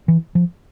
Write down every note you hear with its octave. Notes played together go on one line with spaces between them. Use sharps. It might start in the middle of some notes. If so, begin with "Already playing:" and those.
E3
F3